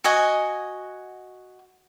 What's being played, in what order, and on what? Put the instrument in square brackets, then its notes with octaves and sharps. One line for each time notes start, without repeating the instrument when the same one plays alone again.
[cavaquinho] F#4 D#5 G#5